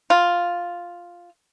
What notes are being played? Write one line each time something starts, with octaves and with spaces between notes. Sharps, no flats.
F4